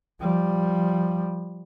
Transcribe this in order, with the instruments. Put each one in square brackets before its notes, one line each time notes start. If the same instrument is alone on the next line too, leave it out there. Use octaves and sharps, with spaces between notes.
[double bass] F3 G3